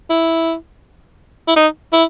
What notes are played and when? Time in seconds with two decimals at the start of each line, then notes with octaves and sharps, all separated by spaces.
0.10 E4
1.48 E4
1.56 D#4
1.93 E4